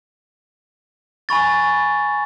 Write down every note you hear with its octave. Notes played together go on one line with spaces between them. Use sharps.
G#5 B5 C#6 A6